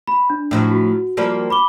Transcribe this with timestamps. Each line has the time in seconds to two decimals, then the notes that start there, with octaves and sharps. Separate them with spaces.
0.08 B5
0.30 D4
0.51 A2 F3 F#3
0.71 F#4
1.17 F3 G3 A#3
1.50 B5 D6 G7